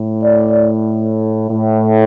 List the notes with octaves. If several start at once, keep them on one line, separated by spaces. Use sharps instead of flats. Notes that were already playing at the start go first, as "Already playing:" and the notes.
Already playing: A2
D5
A2